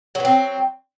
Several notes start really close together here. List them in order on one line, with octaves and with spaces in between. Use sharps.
F#3 B3 C4